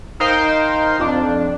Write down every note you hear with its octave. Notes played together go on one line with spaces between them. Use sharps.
D#4 A#4 C5 F5 G5 C6
F2 D4